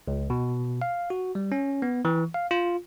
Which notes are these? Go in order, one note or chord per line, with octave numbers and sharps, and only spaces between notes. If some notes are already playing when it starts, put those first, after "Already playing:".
C#2
B2
F5
F#4
G3
C#4
B3
E3
F5
F4